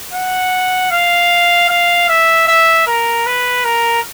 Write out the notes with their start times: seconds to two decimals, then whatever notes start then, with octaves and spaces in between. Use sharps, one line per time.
0.13 F#5
0.91 F5
1.69 F5
2.09 E5
2.48 E5
2.87 A#4
3.26 B4
3.65 A#4